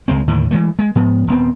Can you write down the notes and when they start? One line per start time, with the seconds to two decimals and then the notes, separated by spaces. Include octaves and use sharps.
0.08 C#2 G#3 C4
0.28 D#2 A2 D3 D#3
0.51 E3 G#3 A3
0.79 G#3
0.95 G#2 F3 B3
1.27 D#1 G2 B3 C4